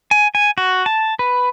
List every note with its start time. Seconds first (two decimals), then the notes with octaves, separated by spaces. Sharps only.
0.11 G#5
0.35 G#5
0.58 F#4
0.86 A5
1.19 B4